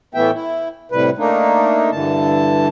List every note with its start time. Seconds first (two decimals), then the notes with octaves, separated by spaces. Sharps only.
0.14 A2 E3 A3 B3 E5 G5
0.33 E4
0.92 A2 C3 G3 B4
1.18 A3 A#3 D4 D#4
1.92 G2 D3 E3 A5